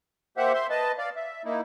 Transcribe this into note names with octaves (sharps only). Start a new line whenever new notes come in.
A#3 G4 C5 E5 F#5
C5 E5 C6
B4 D#5 A5
D5 F5
E5
A#3 D#4 E4